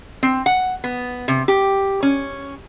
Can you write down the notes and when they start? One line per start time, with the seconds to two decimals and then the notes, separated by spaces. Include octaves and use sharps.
0.23 C4
0.46 F#5
0.84 B3
1.28 C3
1.48 G4
2.03 C#4